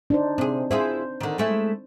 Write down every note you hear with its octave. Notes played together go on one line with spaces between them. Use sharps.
D4 D#4 C5
C3 C4 G#4
E4 F4 G#4 C5
D3 D#3
G#3 A3 E4